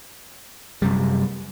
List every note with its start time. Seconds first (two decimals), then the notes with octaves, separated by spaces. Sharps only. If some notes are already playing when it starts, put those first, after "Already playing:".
0.82 F#2 C3 G3